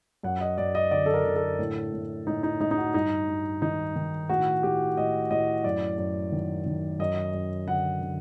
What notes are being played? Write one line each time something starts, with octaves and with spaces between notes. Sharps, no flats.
F#2 F#5
D#5
F#2 D5
D#5
D3 D5
A4
A#4
D3
A4
A2
A2
A2 D#4
D#4
A2 D#4
D#4
F#4
G2 D#4
G2
D#3 D#4
D#3
A2 F#4
A2 G4
A2 D#5
A2 D#5
F#2 D5
F#2
D#3
D#3
F#2 D#5
F#2
D3 F#5
D3